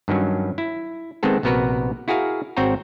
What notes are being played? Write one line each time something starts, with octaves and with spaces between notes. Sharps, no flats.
G2 D#3 F#3 C#4
E4
D#3 G#3 B3 C4 A4
A#1 C3 B3 F#4 A#4 B4
E4 F#4 G#4 A#4 F5
G#1 C4 F#4 C#5 G5 A#5